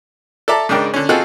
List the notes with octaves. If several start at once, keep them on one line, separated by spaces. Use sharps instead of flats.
A4 D5 E5 A5 A#5
G#2 C#3 G#3 D4 A#4 G5
D3 C#4
C4 D#4 F4 F#4 G#4 A4